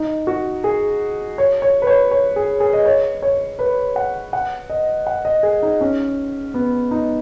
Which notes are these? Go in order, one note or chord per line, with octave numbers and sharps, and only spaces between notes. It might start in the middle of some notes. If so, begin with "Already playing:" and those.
Already playing: D#4
F#4
G#4
C#5
C#5
B4
C#5
C#5
G#4
G#4
D#5
C#5
C#5
B4
F#5
F#5
D#5
F#5
D#5
G#4
D#4
C#4
B3
D#4